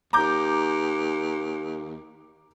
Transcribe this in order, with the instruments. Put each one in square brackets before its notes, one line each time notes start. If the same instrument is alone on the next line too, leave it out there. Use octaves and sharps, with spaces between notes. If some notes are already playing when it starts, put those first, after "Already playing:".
[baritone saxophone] D#2 [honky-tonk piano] A#5 D6 G6